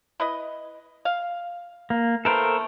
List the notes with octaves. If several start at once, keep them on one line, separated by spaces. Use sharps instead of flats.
E4 B4 D#5
F5
A#3
E3 A3 B3 A4 A#4 C5